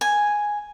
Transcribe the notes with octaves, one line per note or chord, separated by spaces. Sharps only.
G#5